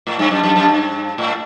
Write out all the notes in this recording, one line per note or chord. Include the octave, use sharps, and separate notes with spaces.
A2
G2
F#2
F#2
F#2
G2
A2